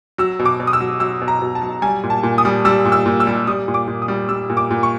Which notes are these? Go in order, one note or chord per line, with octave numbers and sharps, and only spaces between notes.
F#3 E6
B2
D6
B2
D#6
E6
F#3
F#3 E6
B2
A#5
B2
A5
F#3
G3 G#5
A#2
A5
A#2
D#6
G3
G3 E6
A#2
E6
A#2
E6
G3
G3 D#6
A#2
D6
A#2
D#6
G3
G3 E6
A#2
D6
A#2
C#6